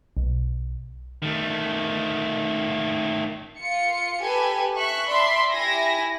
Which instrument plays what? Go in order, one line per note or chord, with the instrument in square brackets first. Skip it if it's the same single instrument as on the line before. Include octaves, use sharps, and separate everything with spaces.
[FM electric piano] B1
[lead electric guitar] D#3 A3
[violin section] F4 C#7
G4 A4 B4 G#5
E5 C#6 F#6
D5 E5 A5 B5 C6
E4 G4 E5 G#5 A#6